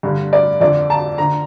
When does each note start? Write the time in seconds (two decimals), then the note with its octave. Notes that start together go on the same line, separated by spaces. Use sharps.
0.03 G2 D3
0.33 D5
0.60 F2 D3 D5
0.90 A5
1.18 D3 A#5